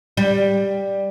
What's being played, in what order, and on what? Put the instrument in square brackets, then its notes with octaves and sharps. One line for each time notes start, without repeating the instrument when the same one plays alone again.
[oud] G3